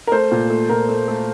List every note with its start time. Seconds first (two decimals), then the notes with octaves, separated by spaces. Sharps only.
0.07 A#4
0.12 A3 C5
0.32 A#2
0.50 A3
0.69 A#2 A#4
0.89 A3
1.08 A3